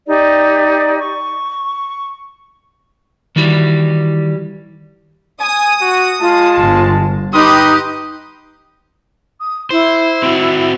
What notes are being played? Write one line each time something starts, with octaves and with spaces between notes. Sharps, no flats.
D#4 G4 D5
C#6
D#3 E3 G3 F#4
G#5 D#6
F#4
G#3 F4 A5
G1
D#4 G4 B4 C6 D#6
D#6
E4 C5
C4 F#4